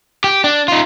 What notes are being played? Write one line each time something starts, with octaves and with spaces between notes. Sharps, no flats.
G4
D4
D#4 F4